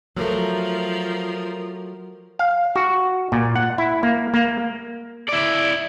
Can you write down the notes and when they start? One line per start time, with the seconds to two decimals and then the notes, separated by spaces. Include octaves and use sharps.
0.17 F3 F#3 A3 A#4
2.39 F5
2.76 F#4
3.32 A#2
3.56 F#5
3.78 E4
4.03 A#3
4.34 A#3
5.29 E4 D5